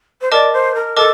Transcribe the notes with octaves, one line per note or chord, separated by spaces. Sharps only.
C5
A#4 D5 D#5 A5 D6
C5
A#4
A4 A#4 D#5 A5 D6